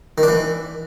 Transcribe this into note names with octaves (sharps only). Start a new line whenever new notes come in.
D#3
D4
E3